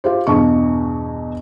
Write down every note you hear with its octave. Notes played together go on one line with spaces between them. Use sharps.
F4 G4 C5
E2 G2 B2 C#6